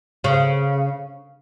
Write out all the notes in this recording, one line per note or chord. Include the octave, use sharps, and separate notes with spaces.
C#3